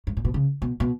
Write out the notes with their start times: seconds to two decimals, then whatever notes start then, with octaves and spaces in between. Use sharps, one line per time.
0.07 G2
0.17 A#2
0.25 B2
0.34 C#3
0.62 B2
0.80 B2